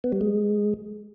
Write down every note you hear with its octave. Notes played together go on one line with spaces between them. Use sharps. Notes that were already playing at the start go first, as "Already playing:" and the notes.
B3
G3
G#3